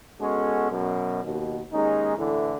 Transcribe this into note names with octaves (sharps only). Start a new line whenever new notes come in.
G#3 B3 C#4 F#4 A4
F#2 B2
D#2 B2
D#2 G#3 C#4 D#4
A2 D3 E3